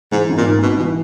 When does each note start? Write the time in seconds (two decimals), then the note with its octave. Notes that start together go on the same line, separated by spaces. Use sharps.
0.12 G#2 E3
0.30 G#1
0.38 A#2
0.46 G#2
0.63 G#1 B2
0.79 B2 E3